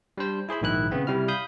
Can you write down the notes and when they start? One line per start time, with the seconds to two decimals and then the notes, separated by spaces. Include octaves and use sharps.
0.18 G3 D4 C5
0.49 E4 G#4 C5 B5
0.61 A#1 G#2 D#3 E4 F#6
0.91 C#3 B3 C4
1.07 C3 G3 E4 F6
1.28 F5 B5 D#6 G6